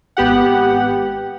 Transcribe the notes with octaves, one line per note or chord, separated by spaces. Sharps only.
G#1 B3 G4 F#5